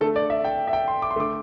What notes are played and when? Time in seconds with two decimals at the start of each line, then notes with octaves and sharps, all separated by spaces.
0.01 D3 A3 A4
0.16 D5
0.30 E5
0.45 G5
0.67 E5
0.73 G5
0.88 C6
1.02 D6
1.11 C6
1.16 D3 A3 D6